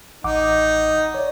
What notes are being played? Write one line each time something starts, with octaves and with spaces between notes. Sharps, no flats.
A1 D#4 F#5 D6
C#5 D5